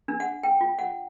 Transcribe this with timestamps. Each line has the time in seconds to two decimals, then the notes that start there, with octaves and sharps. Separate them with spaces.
0.08 D4
0.20 F#5
0.43 G5
0.61 F4
0.79 F#5